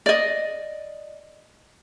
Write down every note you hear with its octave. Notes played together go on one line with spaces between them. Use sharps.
D5 D#5